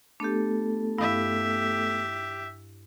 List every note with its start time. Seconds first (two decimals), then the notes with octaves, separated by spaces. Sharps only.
0.20 A3 B3 D4 G4 A4
0.98 G2 E4 G4 E5 F5